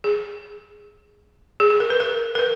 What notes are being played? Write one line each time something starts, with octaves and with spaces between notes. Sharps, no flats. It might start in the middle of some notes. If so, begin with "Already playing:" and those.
G#4
G#4
G#4
A#4
B4
A#4
A#4
B4